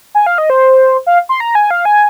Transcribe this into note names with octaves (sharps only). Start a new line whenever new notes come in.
G#5
F5
D#5
C5
F5
C6
A#5
G#5
F5
G#5